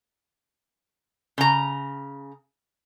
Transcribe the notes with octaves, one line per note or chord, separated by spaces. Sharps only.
C#3 A#5